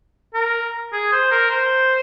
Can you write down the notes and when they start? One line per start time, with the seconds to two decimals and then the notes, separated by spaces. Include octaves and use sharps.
0.34 A#4
0.93 G#4
1.12 C5
1.31 A#4
1.50 C5